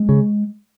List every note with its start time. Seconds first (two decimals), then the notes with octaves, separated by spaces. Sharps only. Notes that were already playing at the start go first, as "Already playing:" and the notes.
Already playing: G#3
0.09 C#3